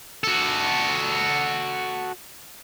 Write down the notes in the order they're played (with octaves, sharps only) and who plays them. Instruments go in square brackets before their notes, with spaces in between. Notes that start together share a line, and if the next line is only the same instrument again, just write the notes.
[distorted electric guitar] F#4 A4